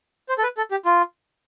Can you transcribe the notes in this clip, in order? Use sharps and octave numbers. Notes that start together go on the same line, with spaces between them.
C5
A4
B4
A4
G4
F4